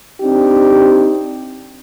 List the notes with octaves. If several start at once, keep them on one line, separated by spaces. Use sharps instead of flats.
C4 D4 D#4 G4